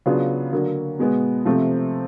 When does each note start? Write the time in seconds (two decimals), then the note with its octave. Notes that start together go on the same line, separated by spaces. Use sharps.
0.06 C#3 F#3 B3 D4 F4
0.52 D3 F#3 A#3
0.99 B2 G#3 B3
1.45 C3 F3 A3 C4